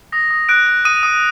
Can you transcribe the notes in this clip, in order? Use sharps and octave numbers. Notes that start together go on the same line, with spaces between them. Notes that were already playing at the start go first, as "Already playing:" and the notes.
D#6 A#6
D#6
F#6 D7
F#6
D#6 D#7
D#6